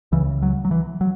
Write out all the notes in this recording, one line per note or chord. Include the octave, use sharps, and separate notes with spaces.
C#2 C#3 E3
F#3
F#3
E3
F#3